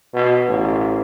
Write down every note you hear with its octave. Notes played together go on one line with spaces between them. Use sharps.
B2
A1